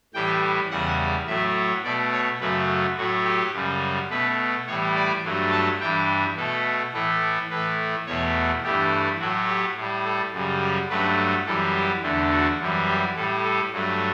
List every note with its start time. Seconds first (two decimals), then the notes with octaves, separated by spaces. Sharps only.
0.14 A2 E3 G3 G5
0.70 E2 C#3 G3 F#5
1.27 A2 F#3 A3 E5
1.84 B2 A3 D5
2.12 C#5
2.40 F#2 C#3 F#3 A3 B4
2.97 A2 F#3 A3 F#4
3.25 G4
3.53 F#2 C#3 G3
4.10 B2 A3 B4
4.67 A2 E3 G3 C#5
4.95 D5
5.24 G2 F#3 A3
5.52 A5
5.80 G2 E3 G3 G5
6.37 B2 A3 A4
6.93 A2 E3 A3 A4
7.50 A2 E3 A3 B4
8.06 E2 B2 A3 C#5
8.63 G2 E3 A3 G4
9.20 A2 F#3 A3 F#4
9.47 G4
9.76 A2 G3
10.04 A4
10.33 F#2 C#3 G3
10.61 G4
10.89 G2 F#3 A3 B4
11.46 F#2 E3 G3 A4
11.74 G4
12.02 E2 D3 A3
12.31 F#4
12.60 F#2 E3 G3
12.87 G4
13.16 A2 G3 A4
13.44 A4
13.72 G2 F#3 A3